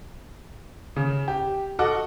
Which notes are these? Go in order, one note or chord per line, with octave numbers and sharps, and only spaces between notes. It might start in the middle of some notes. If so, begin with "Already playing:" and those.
C#3
G4
F#4 A4 D#5 F#5 D6